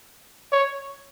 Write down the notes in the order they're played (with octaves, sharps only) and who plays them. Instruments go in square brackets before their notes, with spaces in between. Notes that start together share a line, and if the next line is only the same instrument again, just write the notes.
[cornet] C#5